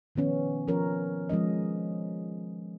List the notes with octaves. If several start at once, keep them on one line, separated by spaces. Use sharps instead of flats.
D#3 F3 B3 C#4
F3 C#4 A#4 C#5
F3 G#3 C#4 D#5